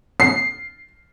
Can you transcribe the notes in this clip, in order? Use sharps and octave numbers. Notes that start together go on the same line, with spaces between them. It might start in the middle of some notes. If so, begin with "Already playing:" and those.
C7